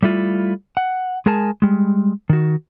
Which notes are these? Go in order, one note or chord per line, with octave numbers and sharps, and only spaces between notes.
G3 A3 E4 F4
F#5
G#3 G#4 A#4 G#5 A5
G3 G#3
D#3 F#4